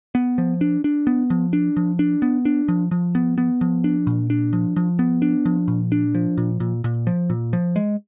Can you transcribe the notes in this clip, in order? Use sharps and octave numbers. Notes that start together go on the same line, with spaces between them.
B3
F3
D4
D4
B3
F3
D4
F3
D4
B3
D4
F3
F3
B3
B3
F3
D4
A#2
D4
F3
F3
B3
D4
F3
A#2
D4
F3
A#2
A#2
A#2
F3
A#2
F3
G#3